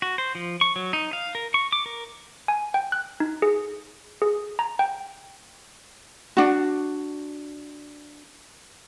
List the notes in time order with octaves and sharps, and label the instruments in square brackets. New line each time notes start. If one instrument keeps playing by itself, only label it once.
[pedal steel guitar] F#4
C5
F3
C#6
F#3
D#4
F5
A#4
C#6
D6
A#4
[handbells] G#5
G5
F#6
D#4
G#4
G#4
A#5
G5
[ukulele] D4 F#4